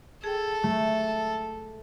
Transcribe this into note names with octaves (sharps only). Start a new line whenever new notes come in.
G#4 A4 G5
A3